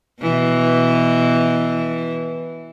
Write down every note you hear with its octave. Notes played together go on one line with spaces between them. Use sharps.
B2 E3